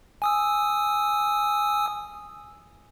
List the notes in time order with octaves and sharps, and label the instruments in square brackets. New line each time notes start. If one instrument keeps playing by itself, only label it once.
[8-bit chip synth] G#5 D#6 E6